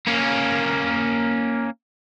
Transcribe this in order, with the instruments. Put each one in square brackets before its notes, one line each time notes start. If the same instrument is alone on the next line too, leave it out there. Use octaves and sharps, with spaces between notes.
[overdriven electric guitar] A#3 C#4